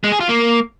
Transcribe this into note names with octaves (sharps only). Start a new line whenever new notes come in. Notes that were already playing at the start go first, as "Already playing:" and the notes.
G#3
G#4
F4
A#3